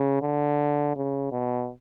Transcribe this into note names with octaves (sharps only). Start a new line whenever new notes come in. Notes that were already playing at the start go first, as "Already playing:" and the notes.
Already playing: C#3
D3
C#3
B2